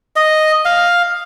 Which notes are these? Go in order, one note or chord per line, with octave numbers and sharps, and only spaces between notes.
D#5
F5